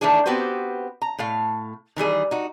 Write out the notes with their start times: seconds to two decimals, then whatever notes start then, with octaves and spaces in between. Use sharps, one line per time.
0.01 D#3 E3 A3 C#4 D4 G#4
0.26 B3 C4 F#4 G4 B4 C5
1.02 A#5
1.19 A2 A3 F5
1.96 D#3 E3 G3 G#4
2.31 D#4 F#4